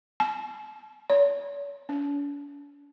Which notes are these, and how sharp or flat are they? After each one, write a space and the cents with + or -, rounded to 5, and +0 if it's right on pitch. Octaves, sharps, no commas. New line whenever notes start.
A5 -45
C#5 +45
D4 -45